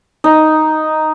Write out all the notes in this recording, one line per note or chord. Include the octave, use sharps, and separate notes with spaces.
D#4